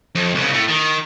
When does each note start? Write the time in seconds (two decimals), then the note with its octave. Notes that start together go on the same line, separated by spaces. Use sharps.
0.15 F2
0.35 C2 C#3
0.53 A2 A3
0.68 D#3